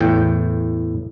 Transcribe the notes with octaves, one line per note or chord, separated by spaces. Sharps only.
E2 A2 G5